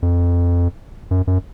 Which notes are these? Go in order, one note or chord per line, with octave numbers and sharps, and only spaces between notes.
F2
F#2
F#2